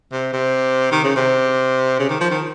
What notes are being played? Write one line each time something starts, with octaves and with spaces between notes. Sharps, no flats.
C3
C3
D#3
C#3
C3
C#3
D#3
F3
D#3